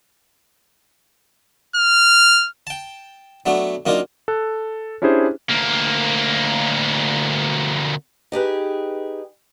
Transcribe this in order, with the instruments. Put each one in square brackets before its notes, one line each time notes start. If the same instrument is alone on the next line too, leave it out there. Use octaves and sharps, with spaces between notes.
[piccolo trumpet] F6
[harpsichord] G5 A5
F#3 A3 B3 D4
F#2 A#3 D4 D#4 F4
[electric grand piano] A4 F#6
C#4 D4 E4 G4 G#4 C5
[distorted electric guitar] D2 A#3
[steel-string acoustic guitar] D#4 G4 G#4 B4